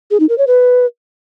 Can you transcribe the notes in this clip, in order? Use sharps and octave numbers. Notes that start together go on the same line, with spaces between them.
G#4
D#4
A#4
C#5
B4